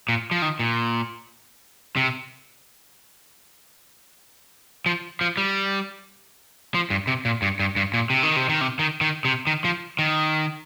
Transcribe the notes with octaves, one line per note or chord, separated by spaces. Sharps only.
A#2
F3
D#3
A#2
C3
F3
F3
G3
F3
G2
C3
A#2
G2
G2
G2
A#2
C3
D#3
C3
D#3
C3
D#3
D#3
C3
D#3
F3
D#3